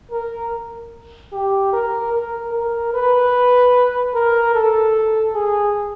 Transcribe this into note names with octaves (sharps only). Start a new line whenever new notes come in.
A#4
G4
A#4
A#4
A#4
B4
A#4
A4
G#4